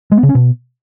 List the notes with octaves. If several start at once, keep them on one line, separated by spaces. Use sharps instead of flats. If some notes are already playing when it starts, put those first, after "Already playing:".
G#3
B3
C#3
C#4
B2